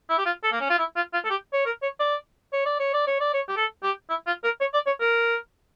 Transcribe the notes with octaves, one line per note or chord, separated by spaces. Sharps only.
E4
G4
F4
A4
A#3
C#4
F4
E4
F4
F4
A4
G4
C#5
A#4
C#5
D5
C#5
D5
C#5
D5
C#5
D5
C#5
G4
A4
G4
E4
F4
A#4
C#5
D5
C#5
A#4